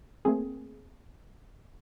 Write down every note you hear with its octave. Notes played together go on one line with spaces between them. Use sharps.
A3 A#3 C4 G#4